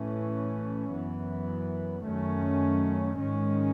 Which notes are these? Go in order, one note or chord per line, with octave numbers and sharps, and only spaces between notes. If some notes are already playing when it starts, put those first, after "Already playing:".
Already playing: A2 E3 A3 C#4
F#2 E3 B3
F#2 D#3 A3 C#4
G#2 D#3 G#3 C#4